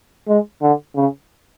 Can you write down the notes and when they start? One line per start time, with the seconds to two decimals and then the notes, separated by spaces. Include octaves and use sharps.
0.28 G#3
0.62 D3
0.96 C#3